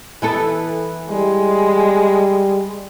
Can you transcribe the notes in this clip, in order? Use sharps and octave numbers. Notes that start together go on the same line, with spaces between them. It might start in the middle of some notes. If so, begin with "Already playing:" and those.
E3 B3 A4
G3 G#3